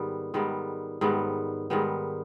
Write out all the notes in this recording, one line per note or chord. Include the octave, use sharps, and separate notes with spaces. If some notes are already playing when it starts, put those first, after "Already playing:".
Already playing: G#2 D#3 G3 B3
G#2 D#3 G3 B3
G#2 D#3 G3 B3
G#2 D#3 G3 B3